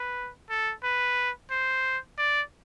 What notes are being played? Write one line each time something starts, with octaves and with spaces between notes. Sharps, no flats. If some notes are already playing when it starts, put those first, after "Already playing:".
Already playing: B4
A4
B4
C5
D5